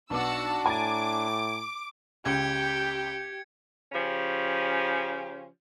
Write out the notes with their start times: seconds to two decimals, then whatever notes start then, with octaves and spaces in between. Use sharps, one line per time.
0.10 B1 B3 D4 F#4 A5 D6 E6
0.66 A2 G#5 A#5 D6 A6 D7
2.25 C#2 G4 G5 G#6 C#7
3.93 C#3 F3 C#4 G4